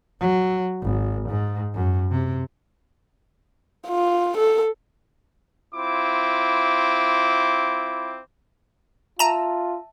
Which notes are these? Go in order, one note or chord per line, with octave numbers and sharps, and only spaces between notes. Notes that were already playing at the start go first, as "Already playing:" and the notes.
F#3
G#1
G#2
F#2
C3
F4
A4
C4 E4 F4 D6
F4 E5 A5 A#5 D#7 E7